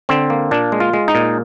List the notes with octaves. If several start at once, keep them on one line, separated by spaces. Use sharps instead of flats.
D3 C4
A#3
A#2 D4
G#3
F4
G#3
D#4
A#2